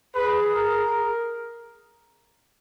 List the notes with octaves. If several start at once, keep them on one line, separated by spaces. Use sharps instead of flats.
G#4 B4
A#4